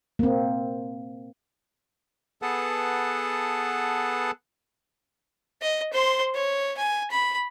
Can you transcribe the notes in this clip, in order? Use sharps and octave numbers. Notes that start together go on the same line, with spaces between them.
A#3 C4
B3 G#4 A4 B4 F#5 A5
D#5
C5 C6
C#5
G#5
B5